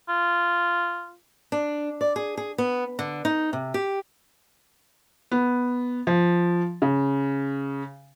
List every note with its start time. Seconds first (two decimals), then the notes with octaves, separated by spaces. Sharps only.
0.09 F4
1.52 D4
2.01 D5
2.16 G#4
2.37 G#4
2.58 B3
2.99 D3
3.25 D#4
3.53 C3
3.74 G4
5.32 B3
6.07 F3
6.82 C#3